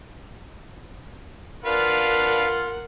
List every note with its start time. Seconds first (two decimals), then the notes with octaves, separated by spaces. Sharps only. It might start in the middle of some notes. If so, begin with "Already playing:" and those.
1.65 D4 F4 A#4 B4 F5 F#5